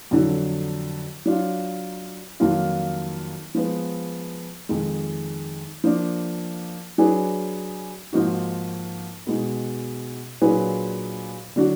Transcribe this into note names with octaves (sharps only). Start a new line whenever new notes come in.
F2 D3 F#3
F#3 D4 F4
F2 D#3 F#3 A#3 F4
F3 G#3 B3
F2 D#3 G#3
F3 A#3 D4
F#3 D4 G#4 B4
G#2 F3 A#3 D#4 F#4
B2 G#3 D#4
A#2 F#3 D4 G#4 B4
D3 F#3 D4 F#4